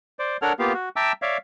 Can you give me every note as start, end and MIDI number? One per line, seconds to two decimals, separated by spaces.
0.19 0.37 72
0.19 0.37 74
0.42 0.53 62
0.42 0.53 69
0.42 0.53 70
0.42 0.53 73
0.42 0.53 78
0.42 0.53 89
0.59 0.73 58
0.59 0.73 59
0.59 0.73 65
0.59 0.73 67
0.59 0.73 77
0.74 0.89 66
0.96 1.12 76
0.96 1.12 79
0.96 1.12 81
0.96 1.12 82
0.96 1.12 86
0.96 1.12 88
1.22 1.37 73
1.22 1.37 74
1.22 1.37 76
1.22 1.37 77